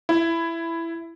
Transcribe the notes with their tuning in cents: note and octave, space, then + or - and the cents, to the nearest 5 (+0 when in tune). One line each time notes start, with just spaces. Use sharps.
E4 +10